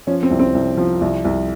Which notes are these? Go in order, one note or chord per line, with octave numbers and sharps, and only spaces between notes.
F3 C#4
C4
C2
C4
C2
F3
C2
C2